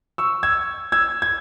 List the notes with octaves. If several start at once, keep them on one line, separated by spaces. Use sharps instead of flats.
C#6 E6
E6 G#6
E6 G#6
G#6